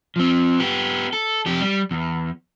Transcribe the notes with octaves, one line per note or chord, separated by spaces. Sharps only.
F3 C4
B3 G4
A4
F2 G4
G3
E2